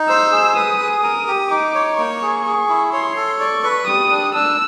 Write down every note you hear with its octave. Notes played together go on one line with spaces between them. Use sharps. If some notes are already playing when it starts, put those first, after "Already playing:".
Already playing: D#4
C5 E6
G#4
B4 D#6
G#4
A#4 D#6
G4
D#4 D6
C#5
A#3 C#6
G#4
G#4
E4
C#5 C6
A4
D5 C#6
B4
G3 D#6
D4
D4 E6